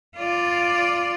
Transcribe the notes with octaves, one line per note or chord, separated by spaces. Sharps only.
F4 D5